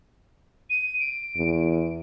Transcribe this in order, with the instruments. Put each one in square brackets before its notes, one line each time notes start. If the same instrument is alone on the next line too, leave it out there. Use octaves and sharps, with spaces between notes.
[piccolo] D#7
D7
[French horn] E2